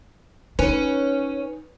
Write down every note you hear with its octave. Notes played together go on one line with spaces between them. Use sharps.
C#4 D#4 B4